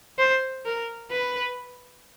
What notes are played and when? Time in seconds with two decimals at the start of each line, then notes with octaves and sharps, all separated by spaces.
0.18 C5
0.65 A#4
1.11 B4